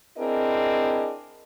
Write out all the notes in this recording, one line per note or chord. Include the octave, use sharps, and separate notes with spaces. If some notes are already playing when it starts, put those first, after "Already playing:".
C4 D4 E4 G#4 A#4 D#5